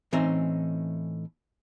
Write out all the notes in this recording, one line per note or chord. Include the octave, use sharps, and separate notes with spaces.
A2 E3 C4 C#4 D#4 A#5